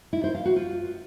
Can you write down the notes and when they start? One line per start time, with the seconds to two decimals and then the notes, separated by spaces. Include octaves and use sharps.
0.13 E4
0.24 C5
0.35 F5
0.45 F#4
0.56 F4